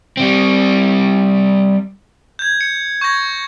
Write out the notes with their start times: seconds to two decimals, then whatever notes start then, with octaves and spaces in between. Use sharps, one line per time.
0.17 G3 C4
2.39 G6 G#6
2.61 C#7
3.01 C#6 G6 G#6 A#6